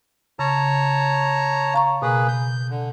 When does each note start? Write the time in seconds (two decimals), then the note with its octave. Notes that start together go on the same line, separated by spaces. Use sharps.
0.39 C#3 C#5 A5 A#5
1.74 F5 A#5 C#6
2.02 B2 A#3 G#4 B4
2.28 G6
2.70 D3